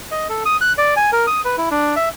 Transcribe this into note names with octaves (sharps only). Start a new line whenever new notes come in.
D#5
A4
D#6
F#6
D5
G#5
A#4
D#6
B4
E4
D4
E5